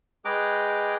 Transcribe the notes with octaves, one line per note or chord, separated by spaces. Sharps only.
G#3 G#4 B4 G5 A#5 D6